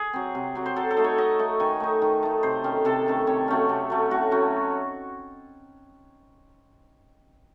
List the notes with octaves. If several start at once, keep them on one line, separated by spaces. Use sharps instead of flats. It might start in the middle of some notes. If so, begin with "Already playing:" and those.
Already playing: G#4
F#3 C4
C3
F#3 C4
C5
F#3 A4
A4
A3 D#4
C#5
F#3 D#5
A3 D#4
D#3 G#5
A3 D#4
D#3
A3 D#4
C3 C5
D#3 A3 C#4
C3 A4
D#3 A3 C#4
C3 C#5
F#3 A3 C#4
C3
F#3 A3 C#4
A2 F#4
F#3 A3 C#4